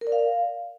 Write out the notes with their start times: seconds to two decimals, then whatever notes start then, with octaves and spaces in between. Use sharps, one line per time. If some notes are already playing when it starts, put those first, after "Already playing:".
0.01 A#4
0.07 D5
0.12 F5